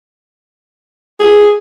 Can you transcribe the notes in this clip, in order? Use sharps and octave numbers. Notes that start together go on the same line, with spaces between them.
G#4